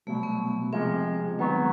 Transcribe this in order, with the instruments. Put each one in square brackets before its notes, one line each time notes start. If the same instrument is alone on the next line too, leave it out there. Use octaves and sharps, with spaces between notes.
[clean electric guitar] C2 B2 F#3 [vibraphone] A3
[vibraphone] B3
[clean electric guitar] C3 F3 G#3 [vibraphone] C4
[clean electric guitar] D#3 F#3 B3 [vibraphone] G#3